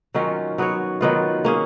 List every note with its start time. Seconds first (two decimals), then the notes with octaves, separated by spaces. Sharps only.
0.14 D#3 F#3 C#4 F4
0.58 F#3 B3 F#4 C#5
1.01 D#3 F#3 B3 F4
1.45 A#3 C#4 G#4